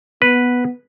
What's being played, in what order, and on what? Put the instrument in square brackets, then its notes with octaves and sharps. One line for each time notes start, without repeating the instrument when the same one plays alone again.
[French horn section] B3 [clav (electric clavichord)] B4